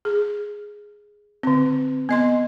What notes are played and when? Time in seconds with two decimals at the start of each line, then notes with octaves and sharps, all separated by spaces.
0.05 G#4
1.43 D3 C4
2.09 B3 D#5 C6